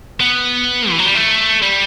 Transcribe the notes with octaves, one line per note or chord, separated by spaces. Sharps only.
B3
E3
F#3
G3
A3
G3